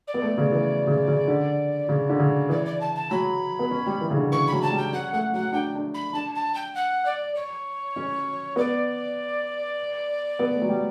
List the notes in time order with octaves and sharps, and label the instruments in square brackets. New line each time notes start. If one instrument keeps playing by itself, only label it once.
[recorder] D5
[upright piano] B3
A3
C#3
E3
C#3
C#3
D3
C#3
D3
C#3
[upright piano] E3 [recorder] D5
[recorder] D5
A5
A5
[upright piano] F#3 [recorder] B5
[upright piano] B3
C#4
G3
E3
C#3
D3
[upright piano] E3 [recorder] C#6
[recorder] B5
[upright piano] F#3
[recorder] A5
[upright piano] G3
[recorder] G5
[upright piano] C#4 [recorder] F#5
[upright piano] A3 [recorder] F#5
[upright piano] F#3 [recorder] F#5
[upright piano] D4 [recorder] G5
[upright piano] D4
[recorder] B5
[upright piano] D4 [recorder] A5
[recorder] A5
G5
F#5
D5
C#5
[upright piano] C#4
[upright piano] B3 [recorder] D5
[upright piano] B3
A3
F#3
G3